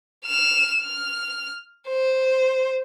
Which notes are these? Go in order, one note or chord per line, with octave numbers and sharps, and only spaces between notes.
F6 E7
F6
C5